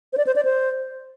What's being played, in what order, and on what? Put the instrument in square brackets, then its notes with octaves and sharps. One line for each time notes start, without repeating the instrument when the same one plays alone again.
[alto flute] C5
D5
C5
D5
C5